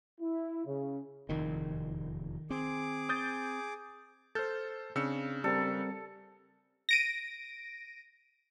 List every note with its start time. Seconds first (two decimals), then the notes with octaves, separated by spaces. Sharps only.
0.20 E4
0.66 C#3
1.29 F1 E2 A#2 D#3
2.50 C4 G#4 D6
3.09 D#6 G6 A6
4.35 A4 C5 F6 G6 A6
4.96 C#3 C4 D4 E6 C#7
5.44 G3 C4 A4 A#4
6.89 A#6 D7 D#7